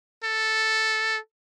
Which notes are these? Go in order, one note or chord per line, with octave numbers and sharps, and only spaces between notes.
A4